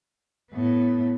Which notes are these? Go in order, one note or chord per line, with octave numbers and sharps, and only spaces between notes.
A2 B3